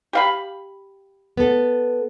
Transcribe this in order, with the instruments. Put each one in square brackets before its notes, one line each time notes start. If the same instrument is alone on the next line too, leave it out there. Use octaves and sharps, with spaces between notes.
[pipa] G4 F5 B5
[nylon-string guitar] B3 A4